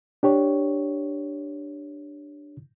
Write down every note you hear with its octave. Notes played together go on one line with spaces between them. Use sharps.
D4 G4 C#5